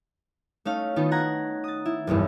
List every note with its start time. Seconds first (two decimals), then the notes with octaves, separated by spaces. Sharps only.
0.65 A3 C#4 D#4 F5
0.96 D#3 B3 D#4 F4 A4
1.11 F#5 A#5 G#6
1.64 D#6 A6
1.85 E4
2.07 F#1 B1 E2 G2